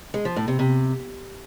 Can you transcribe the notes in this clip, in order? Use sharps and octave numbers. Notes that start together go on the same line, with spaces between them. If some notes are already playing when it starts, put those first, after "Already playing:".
G#3
F3
A2
C3
C3